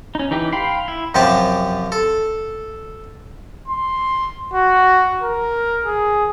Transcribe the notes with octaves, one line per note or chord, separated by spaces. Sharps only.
C#4 D#4
E3 D#4 G4
F5 G5 B5 C6
E4
F#2 C3 F3 G4 A5 D6
A4
C6
F#4
A#4
G#4